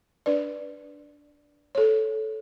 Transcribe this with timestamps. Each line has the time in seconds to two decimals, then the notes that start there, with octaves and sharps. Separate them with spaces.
0.26 D4 B4 D5
1.75 A4 C#5